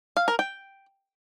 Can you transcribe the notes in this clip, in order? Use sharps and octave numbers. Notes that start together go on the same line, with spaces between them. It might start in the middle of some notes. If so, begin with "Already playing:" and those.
F5
A#4
G5